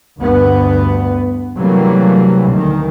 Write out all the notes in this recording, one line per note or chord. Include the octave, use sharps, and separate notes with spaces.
D2 G2 B3
C3 E3 F#3 G3 A3 A#3
D2 D#3